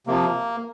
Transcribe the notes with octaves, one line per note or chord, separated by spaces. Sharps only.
C3 F3 A#3